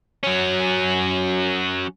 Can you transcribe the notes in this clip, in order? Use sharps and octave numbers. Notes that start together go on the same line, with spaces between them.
F#3 C#4